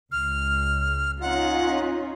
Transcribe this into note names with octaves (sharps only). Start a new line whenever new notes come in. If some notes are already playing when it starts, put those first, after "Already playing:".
C#2 F6
C#4 D#4 F4 F#5